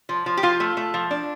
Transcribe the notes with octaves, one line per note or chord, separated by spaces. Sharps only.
F3
F3
G4
F3 F4
A3
A3
F3
D4